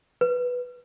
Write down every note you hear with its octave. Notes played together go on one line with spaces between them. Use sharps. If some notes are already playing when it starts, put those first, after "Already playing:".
B4